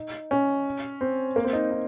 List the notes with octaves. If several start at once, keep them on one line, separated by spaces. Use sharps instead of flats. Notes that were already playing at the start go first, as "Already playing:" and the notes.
Already playing: D#4
C#4
C4
A#3
C4
D#4
D#4